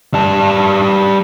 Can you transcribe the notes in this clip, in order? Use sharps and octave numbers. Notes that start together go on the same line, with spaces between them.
G3 A5